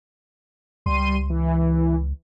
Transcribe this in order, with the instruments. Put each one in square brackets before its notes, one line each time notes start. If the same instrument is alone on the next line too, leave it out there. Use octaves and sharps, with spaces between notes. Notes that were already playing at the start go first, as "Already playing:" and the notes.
[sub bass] C#2 [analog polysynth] G3 C6 D#7
[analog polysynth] E3